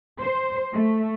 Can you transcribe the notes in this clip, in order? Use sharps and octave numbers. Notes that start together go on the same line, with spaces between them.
C5
A3